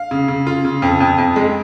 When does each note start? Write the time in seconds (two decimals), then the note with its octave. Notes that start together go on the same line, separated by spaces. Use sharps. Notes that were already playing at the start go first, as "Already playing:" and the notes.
Already playing: F5
0.11 C#3
0.28 C#3
0.47 F4
0.65 C#3
0.82 F2
1.00 F2
1.18 F2
1.36 G#3